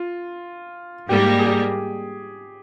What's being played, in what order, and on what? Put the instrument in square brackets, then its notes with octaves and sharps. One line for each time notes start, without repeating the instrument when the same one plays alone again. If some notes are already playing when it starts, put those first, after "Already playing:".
Already playing: [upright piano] F4
[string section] G#2 G3 A#3 [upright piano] G4
[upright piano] G#4
G4